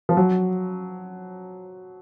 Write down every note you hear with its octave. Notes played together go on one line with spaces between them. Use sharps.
F3
F#3